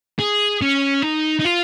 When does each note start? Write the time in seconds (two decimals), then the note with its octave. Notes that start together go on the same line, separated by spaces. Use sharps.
0.19 G#4
0.62 C#4
1.02 D#4
1.39 D#4
1.45 F4